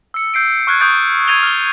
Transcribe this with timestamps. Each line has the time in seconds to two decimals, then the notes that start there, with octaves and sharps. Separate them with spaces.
0.14 E6 C#7
0.34 E6 G6 C7 D7
0.67 C#6 F6 F#6 G#6
0.80 C#6 D#6 G6 A6 D7
1.27 F#6 G#6 A6 D#7 F7 G7
1.43 F6 G7